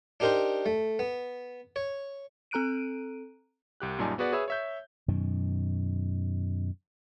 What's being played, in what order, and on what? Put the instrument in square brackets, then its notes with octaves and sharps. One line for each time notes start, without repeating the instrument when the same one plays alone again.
[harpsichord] D4 D#4 G4 A#4 C5 G5
A3
B3
C#5
[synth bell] C4 A4 A#5 F#6 D7 D#7
[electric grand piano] C2 G4 F#6
F#2 A#2 G3 D#4 G#5 A5
B3 F#4 G#4 B4 D5 F#5
G#4 B4 C#5 E5 B5 E6
C#5 E5 G6
[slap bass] F#2 B2 D#3